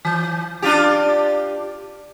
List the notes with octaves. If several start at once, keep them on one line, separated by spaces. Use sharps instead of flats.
E3
D4 F4 G4